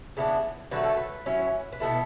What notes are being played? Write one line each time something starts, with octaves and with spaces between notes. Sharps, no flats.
C#3 E3 B3 D4
D3 F#3 A3 B4
A4
B4
F#3 C#4 E4
B4
B2 F#3 B3 E4 A4